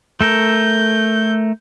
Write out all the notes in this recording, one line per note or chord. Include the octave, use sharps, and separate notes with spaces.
A3 A4 A#4 G6